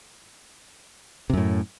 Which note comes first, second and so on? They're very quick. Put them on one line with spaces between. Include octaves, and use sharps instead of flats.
C3 F#2 A2